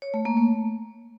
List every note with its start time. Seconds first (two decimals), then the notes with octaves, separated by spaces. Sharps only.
0.02 C#5
0.14 A3
0.25 A#3
0.37 A3